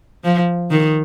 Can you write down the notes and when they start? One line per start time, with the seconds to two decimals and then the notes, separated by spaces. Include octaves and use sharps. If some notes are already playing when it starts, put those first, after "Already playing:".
0.24 F3
0.71 D#3